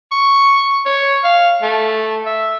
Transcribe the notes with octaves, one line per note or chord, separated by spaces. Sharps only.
C#6
C#5
F5
A3
E5